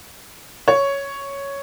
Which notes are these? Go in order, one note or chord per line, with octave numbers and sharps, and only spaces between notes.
C#5